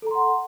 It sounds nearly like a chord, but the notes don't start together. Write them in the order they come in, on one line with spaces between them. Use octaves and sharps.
A4 A#5 C6 F#5